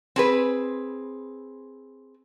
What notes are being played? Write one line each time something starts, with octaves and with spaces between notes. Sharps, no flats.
C4 G#4 B4